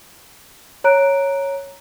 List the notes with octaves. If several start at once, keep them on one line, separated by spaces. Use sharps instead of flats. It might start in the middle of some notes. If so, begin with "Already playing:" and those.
C#5 A#5 F#6 D7